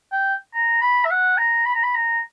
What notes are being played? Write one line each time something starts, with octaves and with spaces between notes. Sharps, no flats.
G5
A#5
B5
E5
F#5
A#5
B5
A#5
B5
A#5